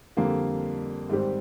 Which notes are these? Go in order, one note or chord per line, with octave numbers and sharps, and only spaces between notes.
F2 D3 G3 A#3
G#2 D#3 G3 C4 G4